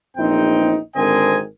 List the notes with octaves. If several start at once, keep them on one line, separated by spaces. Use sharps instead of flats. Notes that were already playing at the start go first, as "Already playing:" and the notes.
A#1 E2 C4 D#4 G5
G#1 D3 C4 A#4 D#5 G#5